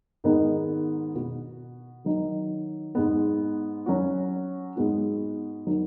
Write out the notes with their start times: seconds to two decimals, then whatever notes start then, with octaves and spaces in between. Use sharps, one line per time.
0.24 G#2 D#3 B3 D#4 G#4
1.15 B2 B3 F#4
2.04 D#3 F#3 D#4
2.95 G#2 G#3 B3
3.86 F#3 C#4 F#4
4.76 G#2 G#3 B3 F#4
5.67 D#3 F#3